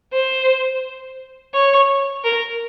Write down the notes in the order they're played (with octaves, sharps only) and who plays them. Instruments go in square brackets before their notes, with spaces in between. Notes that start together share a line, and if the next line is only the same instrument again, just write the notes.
[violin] C5
C#5
A#4